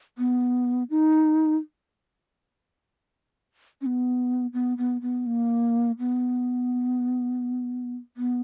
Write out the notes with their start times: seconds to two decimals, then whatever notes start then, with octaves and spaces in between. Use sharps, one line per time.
0.18 B3
0.90 D#4
3.81 C#4
3.86 B3
4.53 B3
4.78 B3
5.02 B3
5.26 A#3
5.99 B3
8.17 B3